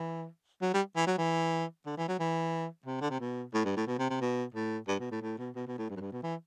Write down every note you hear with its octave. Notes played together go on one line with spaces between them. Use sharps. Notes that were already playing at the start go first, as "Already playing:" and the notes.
Already playing: E3
F#3
G3
E3
F#3
E3
D3
E3
F#3
E3
C3
D3
C3
B2
A2
G2
A2
B2
C3
C3
B2
A2
G2
B2
A2
A2
B2
B2
B2
A2
G2
F#2
G2
B2
E3